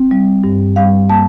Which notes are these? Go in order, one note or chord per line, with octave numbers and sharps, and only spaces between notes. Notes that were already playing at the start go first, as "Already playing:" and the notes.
Already playing: C4
G3
G2
G3 F5
A#3 A5